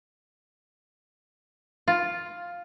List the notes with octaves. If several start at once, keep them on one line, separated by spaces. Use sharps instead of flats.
F4